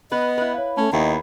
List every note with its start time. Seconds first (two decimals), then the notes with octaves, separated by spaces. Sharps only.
0.12 B3 B4 D#5
0.37 E4 B4
0.54 C#5 F5
0.77 A3 C#4 A5
0.93 D#2 B3 E4 D#5 A#5